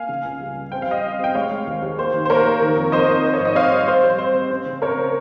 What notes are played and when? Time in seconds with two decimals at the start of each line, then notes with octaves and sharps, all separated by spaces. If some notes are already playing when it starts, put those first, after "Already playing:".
Already playing: A#3 F5 G#5
0.09 C#3
0.24 C#2
0.41 G3
0.56 G3
0.72 C4 G5
0.82 F5
0.88 G3 D#5 G5
1.04 G3
1.19 C4 G5
1.35 G#3 C#5 F5
1.52 G#3
1.67 D#2
1.82 D#2
1.98 A#3 C5
2.14 D#3
2.25 C5
2.30 A#3 A#4 C#5
2.45 A#3
2.62 D#3
2.76 F2
2.92 F2 C5 D#5
3.08 F2
3.24 C4
3.33 C#5
3.40 G#2
3.45 D#5
3.55 C4 C#5 F5
3.71 G3
3.87 C4 C5
4.03 G3 C5
4.18 G3 C5
4.35 C4
4.50 C#4 C5
4.66 C#3
4.82 C#4 A#4 C#5
4.97 C#3